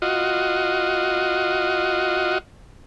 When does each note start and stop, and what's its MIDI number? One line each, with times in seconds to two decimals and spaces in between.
0.02 2.38 65
0.02 2.38 66
0.02 2.38 75